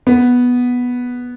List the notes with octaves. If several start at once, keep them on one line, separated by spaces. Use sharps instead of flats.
B3